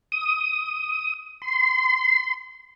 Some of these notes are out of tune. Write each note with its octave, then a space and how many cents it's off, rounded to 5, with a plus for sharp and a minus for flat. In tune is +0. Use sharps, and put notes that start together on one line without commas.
D#6 +15
C6 -30